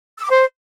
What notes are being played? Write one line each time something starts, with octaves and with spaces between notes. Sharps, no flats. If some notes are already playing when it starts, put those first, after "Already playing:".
E6
D6
C5